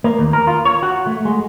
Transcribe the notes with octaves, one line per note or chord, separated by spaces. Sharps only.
A#3
D#2
A#4
F4
C#5
F#4
A3
G#3